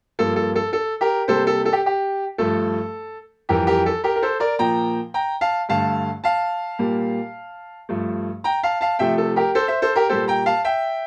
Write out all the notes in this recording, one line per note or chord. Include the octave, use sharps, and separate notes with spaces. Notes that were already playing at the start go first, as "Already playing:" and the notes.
G2 F3 A#3 A4
A4
A4
A4
G4 A#4
C3 G3 A#3 A4 C5
A4
A4
G4
G4
G2 F3 A3 A4
F2 E3 G3 G4 A#4
G4 A#4
A4
G4 A#4
A#4
A4 C5
A#4 D5
A#2 F3 A#3 G5 A#5
G5 A#5
F5 A5
G2 D3 A3 F5 A5
F5 A5
A#2 G3 A#3
G2 F3 A3
G5 A#5
F5 A5
F5 A5
C3 F3 A3 E5 G5
A4
G4 A#4
A4 C5
C5 E5
A4 C5
G4 A#4
A#2 G3 A#3 A4 C5
G5 A#5
F5 A5
E5 G5